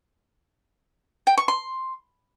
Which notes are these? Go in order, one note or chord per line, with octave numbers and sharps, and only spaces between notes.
G5
C#6
C6